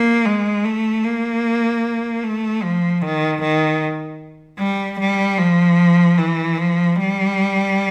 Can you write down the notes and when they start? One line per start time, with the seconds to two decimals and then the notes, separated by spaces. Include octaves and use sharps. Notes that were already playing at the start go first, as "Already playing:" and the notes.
Already playing: A#3
0.25 G#3
0.64 A3
1.04 A#3
2.23 A3
2.63 F3
3.01 D#3
3.42 D#3
4.59 G3
5.00 G3
5.38 F3
6.17 E3
6.57 F3
6.96 G3